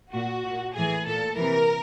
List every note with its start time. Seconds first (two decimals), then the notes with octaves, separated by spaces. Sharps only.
0.13 A#2 F#4
0.44 A#2
0.74 A2 E3 G#4
1.06 A#2 A4
1.37 C3 E3 A#4